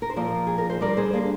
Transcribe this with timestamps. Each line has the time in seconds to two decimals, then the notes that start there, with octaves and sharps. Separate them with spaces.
0.02 A#4
0.10 C5
0.16 A#2 F3 A#4 D5
0.47 G#4
0.58 A#4
0.70 C5
0.81 D3 G3 A#4 D5
0.97 G#4 C5
1.13 A#3 D4